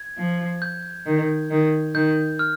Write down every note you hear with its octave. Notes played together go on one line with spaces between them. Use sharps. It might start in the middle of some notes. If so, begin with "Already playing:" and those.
Already playing: G#6
F3
G6
D#3
D#3
D#3 G6
F6